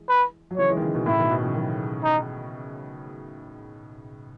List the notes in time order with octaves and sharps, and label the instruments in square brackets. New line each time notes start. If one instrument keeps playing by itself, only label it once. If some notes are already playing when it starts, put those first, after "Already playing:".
Already playing: [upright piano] E3 G#3
[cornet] B4
[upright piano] F#3
[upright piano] C#3 E3 [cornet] C#5
[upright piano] E3 G#3
D#3
C#3 E3
B2 D#3
[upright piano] A2 C#3 [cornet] E4
[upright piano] B2 D#3
B2 D#3
C#3 E3
D#3 F#3
[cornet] D#4